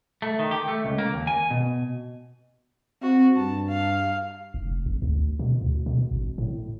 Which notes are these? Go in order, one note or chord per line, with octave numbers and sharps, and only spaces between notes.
A3
D#3
G4
A3
C#2
A#3
D#2
G#5
B2
C4 F#4
G2 A5
F5
F1
G#1
D2
B2
D2
B2
G#1
A2